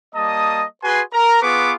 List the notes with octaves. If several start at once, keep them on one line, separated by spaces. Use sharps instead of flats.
G3 A#3 D#5 A5 D#6
F#4 G#4 B4 G#5 C6
A#4 A#5
B3 F4 G#4 B4 C#6 D6